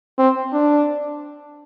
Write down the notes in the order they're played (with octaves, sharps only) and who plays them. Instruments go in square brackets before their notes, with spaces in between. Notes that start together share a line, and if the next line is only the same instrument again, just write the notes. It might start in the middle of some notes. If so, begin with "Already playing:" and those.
[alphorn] C4
D4